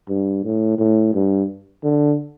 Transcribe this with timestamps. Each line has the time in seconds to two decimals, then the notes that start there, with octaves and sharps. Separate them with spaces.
0.09 G2
0.44 A2
0.78 A2
1.14 G2
1.84 D3